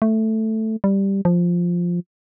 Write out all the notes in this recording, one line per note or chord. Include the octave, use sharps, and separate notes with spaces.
A3
G3
F3